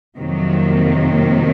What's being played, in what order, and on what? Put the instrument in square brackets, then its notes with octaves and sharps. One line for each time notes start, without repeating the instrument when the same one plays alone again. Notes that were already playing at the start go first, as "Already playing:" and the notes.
[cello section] F2 C3 D#3 F#3 A#3